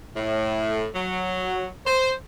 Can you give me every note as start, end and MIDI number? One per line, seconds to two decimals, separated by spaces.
0.17 0.88 45
0.94 1.68 54
1.86 2.12 72